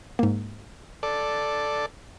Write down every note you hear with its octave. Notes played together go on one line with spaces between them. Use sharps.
G#2 A#3
A4 D5